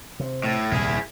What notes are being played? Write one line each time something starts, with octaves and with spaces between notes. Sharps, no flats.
C3
A2
D#1 C2 F2 E4 G#4